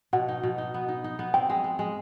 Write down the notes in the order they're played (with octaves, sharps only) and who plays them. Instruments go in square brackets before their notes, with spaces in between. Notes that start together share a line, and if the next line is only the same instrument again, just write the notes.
[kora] B2 [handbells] F#5
[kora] D#4
B2
D#4
B3
D#4
D#4
B3
[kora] C4 [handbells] G5
[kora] G#3
G#3
G#3